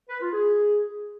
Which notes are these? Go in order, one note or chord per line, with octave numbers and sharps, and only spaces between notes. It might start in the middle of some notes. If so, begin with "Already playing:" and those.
B4
F4
G#4